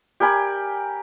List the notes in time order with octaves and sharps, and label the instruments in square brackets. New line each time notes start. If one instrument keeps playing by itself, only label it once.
[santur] G4 A#4 G#5 B5